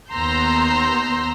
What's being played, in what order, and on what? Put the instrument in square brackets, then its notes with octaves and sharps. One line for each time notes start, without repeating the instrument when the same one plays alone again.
[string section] D#2 B3 A#5 C6 E6 G6